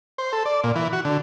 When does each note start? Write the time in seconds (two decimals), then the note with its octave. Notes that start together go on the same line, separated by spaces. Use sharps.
0.18 C5
0.33 A4
0.45 D5
0.64 A#2
0.76 E3
0.93 F#4
1.05 D3